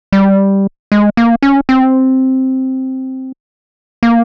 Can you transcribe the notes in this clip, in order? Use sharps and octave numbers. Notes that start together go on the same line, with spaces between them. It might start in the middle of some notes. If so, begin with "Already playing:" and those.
G3
G#3
A#3
C#4
C4
A#3